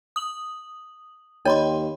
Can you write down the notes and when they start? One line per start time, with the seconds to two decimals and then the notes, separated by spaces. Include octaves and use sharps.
0.16 D#6 F#7
1.45 D#2 C#5 D#5 G5 B5 C6